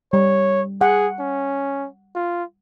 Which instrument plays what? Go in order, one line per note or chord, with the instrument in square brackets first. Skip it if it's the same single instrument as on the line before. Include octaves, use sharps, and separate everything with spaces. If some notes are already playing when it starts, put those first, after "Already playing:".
[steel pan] G3 [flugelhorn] C#5
[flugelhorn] G#4 [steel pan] F#5
[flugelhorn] C#4
F4